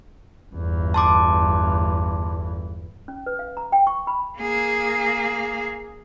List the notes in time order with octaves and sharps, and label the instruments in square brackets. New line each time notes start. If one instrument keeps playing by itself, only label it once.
[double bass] G1 E2
[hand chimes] A5 C6 D6
[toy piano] C#4
B4
F5
A#5
G5
C#6
B5
[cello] A#3 G#4